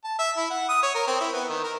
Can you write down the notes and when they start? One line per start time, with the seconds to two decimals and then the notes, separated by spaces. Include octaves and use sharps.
0.04 A5
0.19 E5
0.37 E4
0.50 F#5
0.69 D#6
0.83 C#5
0.95 A#4
1.07 C4
1.21 E4
1.33 B3
1.49 D#3
1.64 A#4